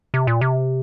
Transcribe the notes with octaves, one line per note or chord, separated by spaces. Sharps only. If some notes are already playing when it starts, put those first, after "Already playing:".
C3
A#2
C3